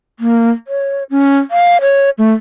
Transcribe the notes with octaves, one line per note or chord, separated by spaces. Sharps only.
A#3
C#5
C#4
F5
C#5
A3